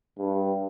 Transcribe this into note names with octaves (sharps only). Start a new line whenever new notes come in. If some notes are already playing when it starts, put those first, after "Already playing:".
G2